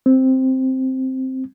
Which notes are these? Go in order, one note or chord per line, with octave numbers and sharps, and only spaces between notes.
C4